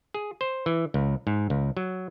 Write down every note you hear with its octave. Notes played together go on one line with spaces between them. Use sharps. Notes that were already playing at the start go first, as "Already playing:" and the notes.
G#4
C5
E3
C#2
G#2
C#2
F#3